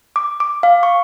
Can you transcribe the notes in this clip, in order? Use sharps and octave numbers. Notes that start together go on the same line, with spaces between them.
D6
D6
F5
C#6